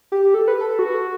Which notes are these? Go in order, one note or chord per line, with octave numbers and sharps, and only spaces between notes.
G4
A4
B4
A4
F#4